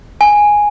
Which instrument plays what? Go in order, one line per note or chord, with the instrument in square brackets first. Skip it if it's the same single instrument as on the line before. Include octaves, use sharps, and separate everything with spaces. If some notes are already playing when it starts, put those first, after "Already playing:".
[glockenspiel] G#5